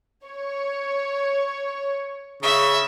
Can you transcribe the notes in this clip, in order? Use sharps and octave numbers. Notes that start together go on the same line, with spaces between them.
C#5
C#3 E5